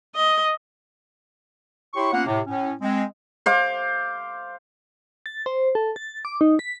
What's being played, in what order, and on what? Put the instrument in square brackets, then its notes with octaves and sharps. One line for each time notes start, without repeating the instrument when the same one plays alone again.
[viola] D#5
[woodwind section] E4 G4 C#5 C6 C#6
A#3 B3 C#4 F4 F#5
A2 C3
A2 C#4
G#3 C4
[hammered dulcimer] C5 F5 D6
[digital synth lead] A6
C5
A4
A6
D6
D#4
B6